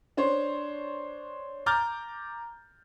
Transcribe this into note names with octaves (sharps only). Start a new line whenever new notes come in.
D4 C5 C#5 C6
A#5 D6 F6 G6 A6